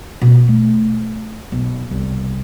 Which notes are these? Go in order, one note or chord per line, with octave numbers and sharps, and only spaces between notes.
B2
A3
B1
C2